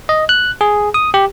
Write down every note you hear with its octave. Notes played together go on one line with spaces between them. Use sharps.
D#5
F#6
G#4
D#6
G4